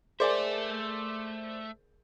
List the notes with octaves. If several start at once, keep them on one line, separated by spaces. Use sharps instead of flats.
A3 G#4 A#4 C5 D5 E5 G#5